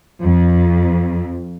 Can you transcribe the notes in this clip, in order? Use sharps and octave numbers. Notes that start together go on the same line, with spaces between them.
F2